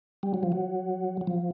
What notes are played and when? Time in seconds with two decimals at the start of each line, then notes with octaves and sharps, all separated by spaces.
0.23 G3
0.34 F#3
0.43 F3
0.52 F#3
1.21 F#3
1.27 F3